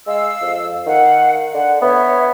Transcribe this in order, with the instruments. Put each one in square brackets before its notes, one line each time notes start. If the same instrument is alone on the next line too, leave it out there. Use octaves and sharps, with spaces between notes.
[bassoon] G#3 [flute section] F5 E6
[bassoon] F2
[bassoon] D#3 [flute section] F5 F#5
[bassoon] D3 [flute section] F#5
[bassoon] B3 [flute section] C#5 E5